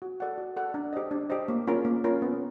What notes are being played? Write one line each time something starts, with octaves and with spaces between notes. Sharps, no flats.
F#4
A4 D5 F#5
F#4
A4 D5 F#5
D4
G4 C5 D#5
D4
G4 C5 D#5
A#3
C#4 F4 A#4
A#3
C#4 F4 A#4
B3